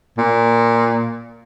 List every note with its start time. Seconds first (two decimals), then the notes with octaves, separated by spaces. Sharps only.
0.18 A#2